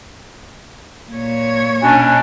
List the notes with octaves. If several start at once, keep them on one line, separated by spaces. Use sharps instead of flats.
A#2 C#5
B2 C#4 D4 G#5